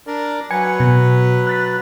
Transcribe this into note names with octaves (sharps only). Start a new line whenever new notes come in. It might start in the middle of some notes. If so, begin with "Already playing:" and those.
D4 A#4 D5
F#3 B4 G#5 G#6 C#7
B2
F#6 A6 B6